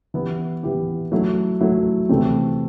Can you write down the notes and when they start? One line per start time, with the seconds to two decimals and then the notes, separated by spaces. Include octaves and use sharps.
0.14 E3 B3 E4 G4
0.63 E3 B3 E4 G4
1.12 F#3 A3 E4
1.61 F#3 A3 E4
2.09 C3 E3 A3 C4